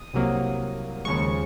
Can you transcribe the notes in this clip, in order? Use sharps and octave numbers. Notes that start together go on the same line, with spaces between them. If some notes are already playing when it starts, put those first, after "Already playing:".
Already playing: D#6
C2 C3 F#3 A#3
D#2 C#3 F3 G#3 C#6